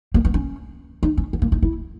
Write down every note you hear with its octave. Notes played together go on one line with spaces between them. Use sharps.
A#3
B3
C#4
D#4
C#4
B3
A#3
D#4
E4